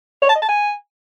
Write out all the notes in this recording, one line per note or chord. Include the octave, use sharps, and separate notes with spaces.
C#5
A5
D#5
A5
G#5